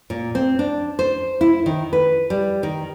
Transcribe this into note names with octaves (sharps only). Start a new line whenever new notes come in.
A#2
C4
D4
C5
E4
D#3
B4
G3
D#3